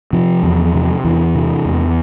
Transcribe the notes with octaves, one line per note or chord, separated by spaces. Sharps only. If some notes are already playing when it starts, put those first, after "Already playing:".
C3 F3
E2
C3
E2 E3
C3
E2